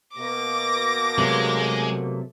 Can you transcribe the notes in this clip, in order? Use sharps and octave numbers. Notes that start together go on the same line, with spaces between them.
B2 A#3 D6 A#6
C3 F#3 G#3 A3